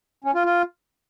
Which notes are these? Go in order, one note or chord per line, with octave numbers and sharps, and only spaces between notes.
C#4
F4
F4